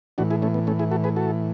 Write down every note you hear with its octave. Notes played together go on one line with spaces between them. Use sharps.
A2 E3 D4 F#4
E4 G#4
A3 C#4
B3
A3 C#4
E4 G#4
F#4 A4
G#4 B4
F#4 A4